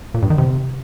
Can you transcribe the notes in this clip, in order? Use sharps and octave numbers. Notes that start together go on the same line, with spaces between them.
A#2
G2
D#3
C3